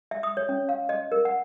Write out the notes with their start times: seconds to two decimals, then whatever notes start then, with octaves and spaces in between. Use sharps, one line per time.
0.11 E5
0.23 D#6
0.37 C#5
0.49 C#4
0.69 F5
0.89 D#5
1.12 A#4
1.25 F#5